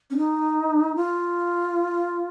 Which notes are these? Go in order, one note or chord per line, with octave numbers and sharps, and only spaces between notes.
C#4
D#4
F4